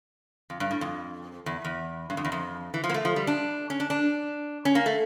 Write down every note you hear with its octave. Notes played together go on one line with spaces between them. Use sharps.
F2
G2
A2
F2
E2
E2
G2
F2
E2
F2
E3
F3
A#3
A3
F3
G3
D4
C#4
D4
D4
C#4
A#3
A3